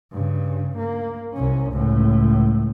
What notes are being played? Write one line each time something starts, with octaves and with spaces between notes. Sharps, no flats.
G2 C#3
A#3
C2 C#4
C#2 A2